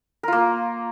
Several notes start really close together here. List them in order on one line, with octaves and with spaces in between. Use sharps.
A#4 F4 A#3